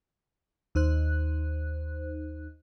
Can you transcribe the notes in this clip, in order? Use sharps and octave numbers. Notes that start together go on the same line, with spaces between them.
D#2 D#4 C5 F#6